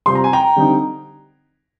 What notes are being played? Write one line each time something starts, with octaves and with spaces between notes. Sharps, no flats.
C3 G3 C4 F4 C6
A#5
G#5
G5 A#5
D3 G3 C4 D#4